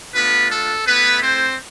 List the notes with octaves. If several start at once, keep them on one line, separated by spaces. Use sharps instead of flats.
A3 B3 D4 F4 B4
A4
A3 B3 E4 B4
C4 C5